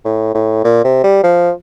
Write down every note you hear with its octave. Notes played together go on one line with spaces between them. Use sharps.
A2
A2
A#2
C3
G3
F3